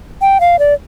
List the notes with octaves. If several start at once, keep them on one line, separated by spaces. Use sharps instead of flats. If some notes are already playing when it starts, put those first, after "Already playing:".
G5
F5
D5